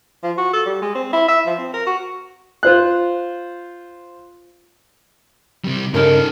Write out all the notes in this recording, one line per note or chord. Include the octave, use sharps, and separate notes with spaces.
F3
F#4
A4
G3
G#3
C4
E4
E5
F3
C4
A#4
F#4
F4 C5 F#6
C3 G3
G2 C#3 D#4 G4 A4 A#4